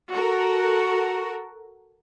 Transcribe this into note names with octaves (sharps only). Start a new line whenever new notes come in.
F#4 A4 A#4